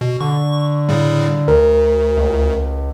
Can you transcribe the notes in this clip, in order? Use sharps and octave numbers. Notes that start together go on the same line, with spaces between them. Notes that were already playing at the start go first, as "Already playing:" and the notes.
B2
D3 C#6
A2 C#3 G3
D2 A#4
C#2